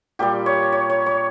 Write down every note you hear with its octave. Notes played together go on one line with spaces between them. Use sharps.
A#2 G3 G4
C#5
C#5
C#5
C#5